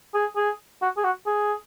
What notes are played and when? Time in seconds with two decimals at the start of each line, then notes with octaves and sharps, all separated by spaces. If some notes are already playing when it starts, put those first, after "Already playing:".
0.15 G#4
0.36 G#4
0.82 F#4
0.97 G#4
1.04 F#4
1.27 G#4